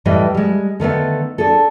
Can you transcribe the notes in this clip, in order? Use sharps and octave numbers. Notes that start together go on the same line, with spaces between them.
A2 E3 G3 B4 D#5
G3 G#3
D3 D#3 A3 B3
D4 G#4 A4